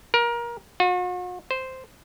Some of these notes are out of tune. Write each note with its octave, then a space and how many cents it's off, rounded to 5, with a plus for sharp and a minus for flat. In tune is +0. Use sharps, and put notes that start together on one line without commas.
A#4 +25
F#4 -45
C5 -5